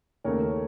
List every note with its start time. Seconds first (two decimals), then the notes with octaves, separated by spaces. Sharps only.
0.24 D#2 C#3 A3 A#4 C#5